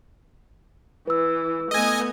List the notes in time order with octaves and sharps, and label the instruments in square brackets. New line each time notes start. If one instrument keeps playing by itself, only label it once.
[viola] E3 [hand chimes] B4 E6
[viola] A3 B3 [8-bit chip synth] D#5 G#5